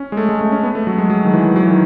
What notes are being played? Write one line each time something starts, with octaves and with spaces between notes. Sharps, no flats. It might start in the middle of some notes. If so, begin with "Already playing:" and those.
Already playing: C#4
G#3
A3
G#3
A3
C#4
B3
A3
F#3
G#3
F#3
D#3
E3
F#3
E3
D#3